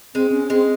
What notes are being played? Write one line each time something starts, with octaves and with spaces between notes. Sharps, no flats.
G#3 C4
C#4
G#3 C4